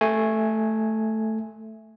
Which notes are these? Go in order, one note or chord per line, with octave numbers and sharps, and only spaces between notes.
A3 G#5